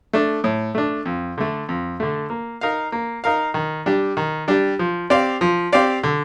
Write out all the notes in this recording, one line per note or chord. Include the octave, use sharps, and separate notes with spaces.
A3 D4
A2
A3 D4
F2
D3 A3
F2
D3 A3
A#3
D#4 A#4 F5
A#3
D#4 A#4 F5
D#3
G3 D4 G4
D#3
G3 D4 G4
F3
C4 G4 D5 F5
F3
C4 G4 D5 F5
D3